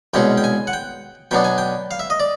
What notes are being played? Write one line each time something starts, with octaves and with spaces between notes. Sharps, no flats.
C2 B2 G#3 C#4 G5
G5
G#5
F#5
G5
B2 F#3 B3 D4 G5
G#5
G5
F5
E5
D#5
D5